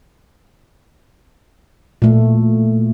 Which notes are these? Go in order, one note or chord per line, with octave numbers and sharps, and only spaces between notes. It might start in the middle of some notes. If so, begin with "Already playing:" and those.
A#2 A3